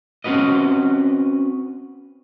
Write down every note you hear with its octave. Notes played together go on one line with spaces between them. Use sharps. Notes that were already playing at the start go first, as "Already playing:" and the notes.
C4 C#4 F#4 B4 D#5